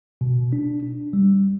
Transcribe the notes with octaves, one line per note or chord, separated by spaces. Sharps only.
B2
D4
D4
G3